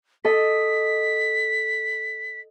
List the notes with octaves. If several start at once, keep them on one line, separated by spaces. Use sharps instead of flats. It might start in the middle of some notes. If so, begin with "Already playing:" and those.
A4 D#5 B6